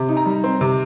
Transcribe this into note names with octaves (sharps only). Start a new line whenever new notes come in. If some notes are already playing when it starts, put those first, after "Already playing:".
Already playing: C3
D#4
A#5
G3
C4
C3